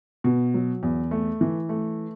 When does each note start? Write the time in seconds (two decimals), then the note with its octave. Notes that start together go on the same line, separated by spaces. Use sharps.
0.24 B2
0.54 F#3
0.83 E2
1.11 A3
1.41 E3
1.69 A3